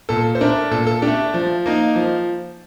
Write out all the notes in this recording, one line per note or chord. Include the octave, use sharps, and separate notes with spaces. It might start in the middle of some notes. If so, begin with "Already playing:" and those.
A#2 A4
C5
A3 D4 A#4
A#2 A4
A4
D4 G4
A3
F3
A#3 D#4
F3